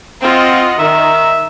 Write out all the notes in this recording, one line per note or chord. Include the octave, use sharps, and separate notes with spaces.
C4 F4 D#5 F#5
D#3 E5